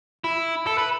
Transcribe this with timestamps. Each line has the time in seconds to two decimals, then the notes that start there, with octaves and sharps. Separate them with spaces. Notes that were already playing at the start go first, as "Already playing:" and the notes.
0.24 E4
0.67 A4
0.78 B4